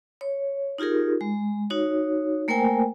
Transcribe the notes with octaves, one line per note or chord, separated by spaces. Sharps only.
C#5
D#4 F4 G4 G#4 A#4
G#3
D#4 F#4 C#5
A3 A#3 A#4 C5 G5 G#5